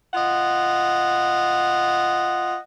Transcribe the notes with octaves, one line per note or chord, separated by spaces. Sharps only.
F4 D#5 F#5